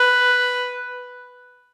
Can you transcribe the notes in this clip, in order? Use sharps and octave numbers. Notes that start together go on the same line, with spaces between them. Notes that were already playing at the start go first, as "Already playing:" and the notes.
Already playing: B4